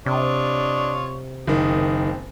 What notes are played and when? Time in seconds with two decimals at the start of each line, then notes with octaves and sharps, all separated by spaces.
0.06 C3 D4 F4 C#5 D#5
1.47 F#1 D#3 C4 D#6